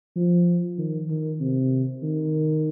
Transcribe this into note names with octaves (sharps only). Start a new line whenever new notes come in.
F3
D#3
D#3
C3
D#3